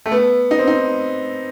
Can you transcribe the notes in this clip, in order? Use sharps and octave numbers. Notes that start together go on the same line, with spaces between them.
A3
B3
D#4
C4
D#4